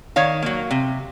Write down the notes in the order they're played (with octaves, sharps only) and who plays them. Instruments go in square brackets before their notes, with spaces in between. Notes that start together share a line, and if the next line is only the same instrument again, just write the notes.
[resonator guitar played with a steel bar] D#3 C#5 F5
F#3 A#3
C3